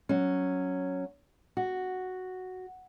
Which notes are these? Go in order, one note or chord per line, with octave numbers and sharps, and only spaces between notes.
F#3 C#4
F#4